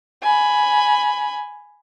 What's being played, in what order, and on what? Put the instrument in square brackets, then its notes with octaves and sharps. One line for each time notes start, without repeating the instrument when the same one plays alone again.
[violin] G#5 B5